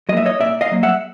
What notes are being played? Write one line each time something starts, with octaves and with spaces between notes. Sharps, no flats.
F#3 A#3 D#5 E5
C#5 D#5
A#2 D5 E5
D#5 F5
F#3 A#3
E5 F#5